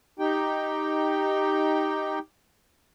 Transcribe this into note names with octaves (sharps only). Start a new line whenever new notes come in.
D#4 G4 G5